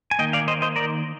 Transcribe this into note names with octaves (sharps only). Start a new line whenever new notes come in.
G#5
D#3 A#3 D#5 G5
D5 F5
C5 D#5
C5 D#5
A#4 D5